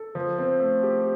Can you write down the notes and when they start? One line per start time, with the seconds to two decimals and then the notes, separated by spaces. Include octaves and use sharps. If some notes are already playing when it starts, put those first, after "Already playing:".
Already playing: A4
0.15 F3
0.38 C4
0.60 A3
0.83 G4